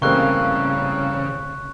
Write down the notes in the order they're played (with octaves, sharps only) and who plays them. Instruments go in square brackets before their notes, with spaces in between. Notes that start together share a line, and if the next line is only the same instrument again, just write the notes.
[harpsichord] A1 G2 [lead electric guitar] C#3 [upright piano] A#3 C4 [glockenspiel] C#6 F#6